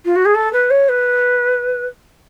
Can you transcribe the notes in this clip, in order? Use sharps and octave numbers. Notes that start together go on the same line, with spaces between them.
F4
F#4
G#4
A4
B4
C#5
B4